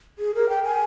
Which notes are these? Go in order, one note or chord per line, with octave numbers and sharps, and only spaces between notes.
G#4
A#4
G5
G#5